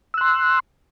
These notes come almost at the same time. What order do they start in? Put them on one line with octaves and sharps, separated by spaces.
E6 F#6 C6